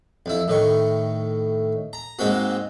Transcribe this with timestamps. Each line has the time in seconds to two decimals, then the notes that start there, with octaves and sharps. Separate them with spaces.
0.26 F2 E4
0.48 A2 D#3 C#6
1.93 A#5
2.19 G#2 G#3 A#3 C4 F#4